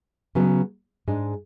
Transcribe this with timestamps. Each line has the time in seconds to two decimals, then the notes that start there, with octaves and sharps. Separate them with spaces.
0.35 C#3 F#3 B3
1.08 G#2 G#3 D4